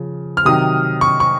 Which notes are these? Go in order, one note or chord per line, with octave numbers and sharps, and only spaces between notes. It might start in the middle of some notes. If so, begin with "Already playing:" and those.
Already playing: C#3 F3
F6
C3 D#3 F#3 D#6
C#6
C#6